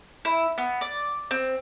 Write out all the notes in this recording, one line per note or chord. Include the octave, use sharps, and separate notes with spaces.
E4
B3
D5
C4